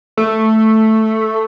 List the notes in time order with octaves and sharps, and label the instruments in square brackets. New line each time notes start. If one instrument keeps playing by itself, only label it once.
[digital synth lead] A3